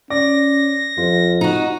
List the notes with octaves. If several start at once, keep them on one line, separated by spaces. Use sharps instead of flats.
C#4 D5 D6 A#6
F2 F4
D#4 F#4